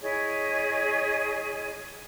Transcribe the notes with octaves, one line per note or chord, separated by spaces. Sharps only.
E4 G#4 C#5 D#5